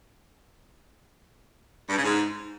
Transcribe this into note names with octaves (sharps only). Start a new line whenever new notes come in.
G2
C#3
G#2